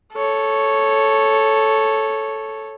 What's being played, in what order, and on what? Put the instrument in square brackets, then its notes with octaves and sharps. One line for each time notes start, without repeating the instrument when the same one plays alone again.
[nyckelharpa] A4 C#5